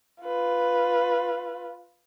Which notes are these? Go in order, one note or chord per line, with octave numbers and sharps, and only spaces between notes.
F4 B4